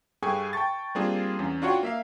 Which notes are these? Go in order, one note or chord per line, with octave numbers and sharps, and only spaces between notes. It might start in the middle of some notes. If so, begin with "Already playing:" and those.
G2 G#4 A4 G5 G#5 C#6
G5 A5 C#6 A6
G3 A#3 C4 D4 F4 G#4
E2 C#4
D4 F4 F#4 C#5 F#5 G5
A#3 E5 F5